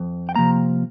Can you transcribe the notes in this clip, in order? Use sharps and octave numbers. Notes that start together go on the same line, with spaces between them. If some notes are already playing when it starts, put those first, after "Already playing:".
Already playing: F2
G5
C3 F3 A#3 A#5